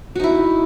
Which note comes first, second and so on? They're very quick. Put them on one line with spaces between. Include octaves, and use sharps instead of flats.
F#4 D#4 E4